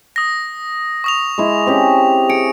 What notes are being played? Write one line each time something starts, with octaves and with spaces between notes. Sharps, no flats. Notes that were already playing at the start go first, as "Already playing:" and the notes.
D#6 A#6
C#6 D#6 F7
G#3 E4
C4 C#4 G4
G#4 C#7 D7